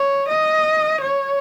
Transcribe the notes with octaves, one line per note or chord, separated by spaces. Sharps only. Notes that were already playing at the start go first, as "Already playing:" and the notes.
Already playing: C#5
D#5
C#5